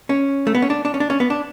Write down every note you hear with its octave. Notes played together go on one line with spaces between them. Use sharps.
C#4
A3
B3
C#4
D4
D4
C#4
D4
C#4
B3
D4